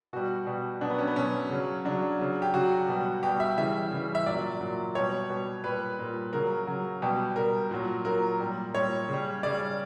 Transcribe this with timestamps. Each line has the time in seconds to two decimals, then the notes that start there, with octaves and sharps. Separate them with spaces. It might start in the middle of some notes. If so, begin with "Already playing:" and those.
0.13 B2 G3 F#4
0.47 B2 G3
0.81 B2 F#3 D4
0.90 B3
0.99 C#4
1.08 B3
1.16 B2 F#3 C#4
1.50 C#3 F#3
1.85 C#3 F#3 D4
2.19 C#3 F#3
2.42 G4
2.54 C#3 F#3 F#4
2.88 B2 G3
3.23 B2 G3 G4
3.40 E5
3.57 C#3 E3 G3 E5
3.91 C#3 E3 G3
4.15 E5
4.26 A#2 F#3 D5
4.61 A#2 F#3
4.95 B2 G3 C#5
5.30 B2 G3
5.64 A#2 G3 B4
5.99 A#2 G3
6.33 C#3 F#3 A#4
6.67 C#3 F#3
7.02 B2 G3 G4
7.36 B2 G3 A#4
7.71 A#2 F#3
8.05 A#2 F#3 A#4
8.40 A#2 G3
8.74 A#2 G3 C#5
9.09 C#3 G3
9.43 C#3 G3 D5